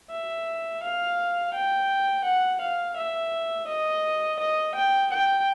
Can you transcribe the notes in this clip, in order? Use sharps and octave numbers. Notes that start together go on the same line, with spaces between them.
E5
F5
G5
F#5
F5
E5
D#5
D#5
G5
G5